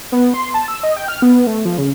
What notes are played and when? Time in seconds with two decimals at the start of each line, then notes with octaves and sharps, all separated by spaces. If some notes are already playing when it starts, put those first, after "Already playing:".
0.12 B3
0.34 C6
0.54 A5
0.68 E6
0.83 D#5
0.97 G5
1.08 F6
1.22 B3
1.47 A3
1.65 F3
1.78 C#3